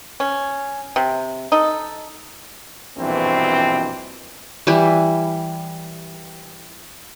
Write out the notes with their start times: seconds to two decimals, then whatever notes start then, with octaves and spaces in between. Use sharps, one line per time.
0.20 C#4
0.96 C3
1.52 D#4 A4
2.98 A#1 G2 B2 E3 C4
4.67 E3 G3 E4